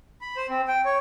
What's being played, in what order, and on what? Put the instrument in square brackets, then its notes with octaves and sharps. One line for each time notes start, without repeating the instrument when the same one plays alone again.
[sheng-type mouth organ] B5
C5
C4
G5
C#5